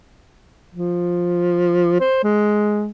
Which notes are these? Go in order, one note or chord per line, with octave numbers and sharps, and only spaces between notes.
F3
C5
G#3